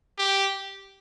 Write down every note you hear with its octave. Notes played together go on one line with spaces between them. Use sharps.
G4